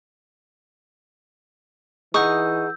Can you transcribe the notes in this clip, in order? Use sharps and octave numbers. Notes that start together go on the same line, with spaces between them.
E3 D#4 G#4 F#5 C#6 D#6 E6 G6